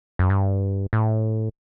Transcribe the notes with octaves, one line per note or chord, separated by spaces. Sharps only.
F#2
G2
A2